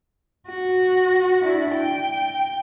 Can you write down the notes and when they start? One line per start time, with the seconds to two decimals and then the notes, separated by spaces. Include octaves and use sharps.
0.49 F#4
1.43 D4 E4
1.76 G5